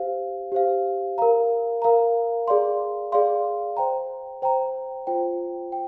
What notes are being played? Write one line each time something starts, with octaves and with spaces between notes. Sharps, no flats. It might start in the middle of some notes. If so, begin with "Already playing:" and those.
Already playing: G4 C5 F5
G4 C5 F5
A#4 F5 A#5
A#4 F5 A#5
G#4 D5 F5 C6
G#4 D5 F5 C6
C5 G5 A#5
C5 G5 A#5
F4 C5 G5
G5